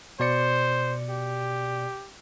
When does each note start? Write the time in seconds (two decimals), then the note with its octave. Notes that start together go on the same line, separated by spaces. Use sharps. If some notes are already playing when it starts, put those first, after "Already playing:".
0.20 B2 C5 D5 C#7
1.10 G4